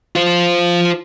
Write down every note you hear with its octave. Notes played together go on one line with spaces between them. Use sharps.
F4 C5